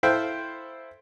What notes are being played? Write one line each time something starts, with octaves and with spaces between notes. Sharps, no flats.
E4 A4 C5 E5 F5 G5